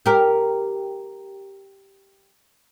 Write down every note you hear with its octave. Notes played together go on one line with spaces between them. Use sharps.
G4 A#4